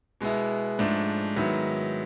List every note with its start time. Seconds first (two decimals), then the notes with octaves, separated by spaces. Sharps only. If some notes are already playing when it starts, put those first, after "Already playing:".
0.21 B2 G#3 B3 E4
0.79 G#2 F3 A3 D4
1.36 G#2 D#3 F#3 B3 E4